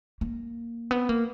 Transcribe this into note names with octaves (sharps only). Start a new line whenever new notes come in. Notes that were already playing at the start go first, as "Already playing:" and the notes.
A#3
B3
A#3